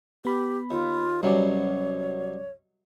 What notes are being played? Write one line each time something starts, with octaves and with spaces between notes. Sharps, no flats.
B3 G4 B5
D#2 F4
C2 B2 F#3 G3 C#4 C#5 D5